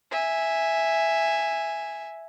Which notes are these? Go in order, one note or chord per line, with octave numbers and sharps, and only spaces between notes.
E5 G#5